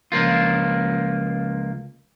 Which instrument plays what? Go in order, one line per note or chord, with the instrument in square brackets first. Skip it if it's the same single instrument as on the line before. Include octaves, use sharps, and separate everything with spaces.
[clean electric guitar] C#2 F3 A#3 F4